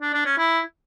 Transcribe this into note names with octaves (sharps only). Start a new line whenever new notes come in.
D4
D4
C#4
E4